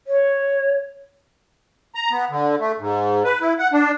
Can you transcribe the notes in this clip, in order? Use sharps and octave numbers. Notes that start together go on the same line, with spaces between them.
C#5
A#5
B3
D3
A3
G#2
B4
E4
F#5
D4